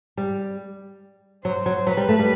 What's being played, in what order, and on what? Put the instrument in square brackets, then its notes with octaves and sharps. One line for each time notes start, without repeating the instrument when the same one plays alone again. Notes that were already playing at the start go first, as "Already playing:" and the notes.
[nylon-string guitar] G3
[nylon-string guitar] F#3 [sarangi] C5
[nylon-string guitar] F#3
[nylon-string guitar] F#3 [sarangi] B4
[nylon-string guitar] G3
A3
G3